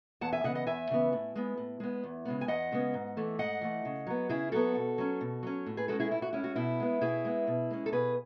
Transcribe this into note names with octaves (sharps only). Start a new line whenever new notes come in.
E2 F#5 A5
E5 G#5
C#3 E3 B3 D#5 F#5
D#5 F#5
E2 E5 G#5
C#3 E3 B3
A2
G#3 B3
A2
G#3 B3
E2
C#3 G#3 B3
G#5
E2 D#5 F#5
C#3 G#3 B3
G#2
E3 A3
G#2 D#5 F#5
E3 A3
C#3
F#3 B3
C#3 E4 G#4
F#3 B3 F#4 A4
B2
F#3 C#4
B2
F#3 C#4
A2
G#4 B4
G#3 C#4 F#4 A4
E4 G#4
A2 E4
F#4
G#3 C#4 E4
F#4
B2 E4
G#3 B3
B2 E4 G#4
G#3 B3
B2
G#3 C#4
A4
B2 G#4 B4